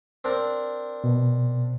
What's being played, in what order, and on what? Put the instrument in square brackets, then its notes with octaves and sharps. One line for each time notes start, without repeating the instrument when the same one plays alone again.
[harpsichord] C4 D4 A#4
[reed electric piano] B2